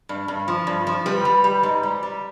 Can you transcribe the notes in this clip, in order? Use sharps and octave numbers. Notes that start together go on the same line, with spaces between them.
G2
G2
F3
G2
F3
G3 B4
G3
G3
G#2
G3
G3